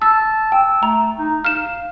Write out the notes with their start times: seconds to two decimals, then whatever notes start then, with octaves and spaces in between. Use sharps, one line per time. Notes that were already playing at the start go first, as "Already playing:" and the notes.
0.02 A5 E6
0.52 G5 E6
0.83 A3 A#5
1.19 D#4
1.45 F5 F6 E7